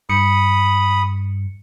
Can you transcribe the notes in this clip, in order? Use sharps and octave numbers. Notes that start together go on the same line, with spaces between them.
G2 B5 D#6 C#7